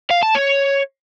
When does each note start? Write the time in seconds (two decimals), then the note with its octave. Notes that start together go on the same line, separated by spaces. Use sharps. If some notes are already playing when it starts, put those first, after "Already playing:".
0.11 F5
0.23 A5
0.35 C#5